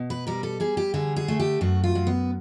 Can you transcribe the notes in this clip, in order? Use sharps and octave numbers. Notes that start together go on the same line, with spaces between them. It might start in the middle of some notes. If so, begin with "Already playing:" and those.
Already playing: B2
B4
G3 A#4
A4
G3 G#4
G4
D3 G#4
G#4
A3
G4
F#2 F#4
F4
F#2
B3